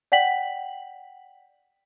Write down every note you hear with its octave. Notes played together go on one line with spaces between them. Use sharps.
D5 F#5 G5 B6 F#7